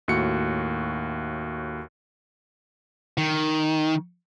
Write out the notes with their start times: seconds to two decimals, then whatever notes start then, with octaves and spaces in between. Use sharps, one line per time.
0.08 D#2 A2 F#4 C#7
3.18 D#3